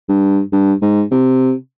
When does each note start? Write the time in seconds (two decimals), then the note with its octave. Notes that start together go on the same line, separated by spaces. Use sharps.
0.09 G2
0.52 G2
0.82 G#2
1.11 C3